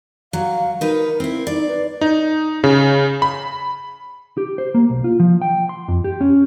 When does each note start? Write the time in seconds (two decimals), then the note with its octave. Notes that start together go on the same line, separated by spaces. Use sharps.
0.33 F#3 F5
0.81 D#4 A#4 B4
1.20 C4 E4
1.47 D#4 D5
1.68 B4
2.01 D#4
2.64 C#3
3.22 B5
4.37 G4
4.58 C5
4.75 A#3
4.90 B1
5.04 F4
5.20 F3
5.42 G5
5.69 C6
5.88 F2
6.04 G4
6.21 C#4